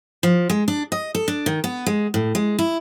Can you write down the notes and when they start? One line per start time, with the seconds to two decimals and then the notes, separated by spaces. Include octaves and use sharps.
0.23 F3
0.50 G#3
0.68 D4
0.92 D#5
1.15 A4
1.28 D4
1.46 D#3
1.64 B3
1.86 G#3
2.14 A2
2.35 G#3
2.59 E4